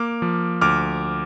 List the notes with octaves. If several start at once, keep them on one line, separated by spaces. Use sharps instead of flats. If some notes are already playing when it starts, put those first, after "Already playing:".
Already playing: A#3 D6 F6
F3
D2 D6 F6